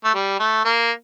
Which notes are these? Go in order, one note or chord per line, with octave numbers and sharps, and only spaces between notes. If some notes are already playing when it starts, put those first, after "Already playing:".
A3
G3
A3
A#3